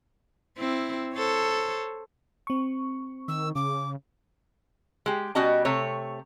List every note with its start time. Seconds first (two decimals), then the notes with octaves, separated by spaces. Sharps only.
0.58 C4 E4
1.14 A4 C5 C#5
2.47 C4 C#6
3.28 D#3 E6
3.55 C#3 D6
5.06 G#3 G4
5.35 B2 G3 C#4 F#4 D#5 A5
5.65 C3 A3 C#5